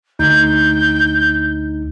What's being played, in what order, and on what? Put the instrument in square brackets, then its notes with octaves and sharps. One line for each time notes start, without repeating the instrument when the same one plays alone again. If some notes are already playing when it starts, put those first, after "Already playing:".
[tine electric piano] D2 D#4 [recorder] G6